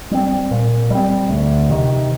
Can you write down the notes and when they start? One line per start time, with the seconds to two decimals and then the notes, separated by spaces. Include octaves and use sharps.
0.11 G3 C4
0.51 A#2
0.90 G3 C4
1.30 D2
1.70 C3 D#3